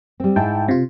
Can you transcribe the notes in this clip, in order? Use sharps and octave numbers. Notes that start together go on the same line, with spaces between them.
G3 C4
G#2 E4 G5 A5
C3 F4